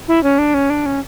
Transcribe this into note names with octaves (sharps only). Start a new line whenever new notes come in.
E4
C#4
D4
C#4
D4
C#4